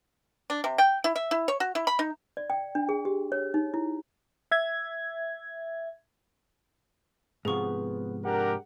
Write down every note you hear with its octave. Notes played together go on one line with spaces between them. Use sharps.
D4
C3
G5
E4
E5
E4
C#5
F#4
E4
B5
D#4
D5
G5
D4
G#4
G4
C#5
D#4
E4
E5 G#6
G#2 C3 F3 B3 G#4 C#6
D4 G4 A#4 F#5